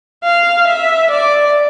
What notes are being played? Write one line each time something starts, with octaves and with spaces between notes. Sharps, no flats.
F5
E5
D5